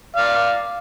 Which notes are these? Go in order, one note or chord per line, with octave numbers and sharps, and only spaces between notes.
D5 F5